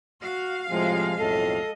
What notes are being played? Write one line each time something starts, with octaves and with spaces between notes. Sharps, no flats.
F#4 F5
A2 C3 F3 G#3
B1 F2 A2 A4 D#5